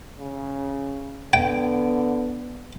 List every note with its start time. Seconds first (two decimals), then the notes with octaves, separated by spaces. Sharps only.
0.19 C#3
1.33 D3 B3 G5